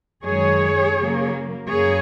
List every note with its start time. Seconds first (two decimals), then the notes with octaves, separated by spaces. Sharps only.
0.24 F#2 D#3 G#3 G#4 C#5
0.97 C#3 F#3 A#3
1.69 F#2 C#3 A#3 G#4 C#5